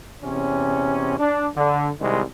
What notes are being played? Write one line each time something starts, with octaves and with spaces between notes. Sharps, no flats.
E2 C3 C#4
D4
D3
C2 C3 D#3 G#3